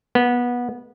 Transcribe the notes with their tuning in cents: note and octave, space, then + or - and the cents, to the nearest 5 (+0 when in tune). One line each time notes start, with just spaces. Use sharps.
B3 -20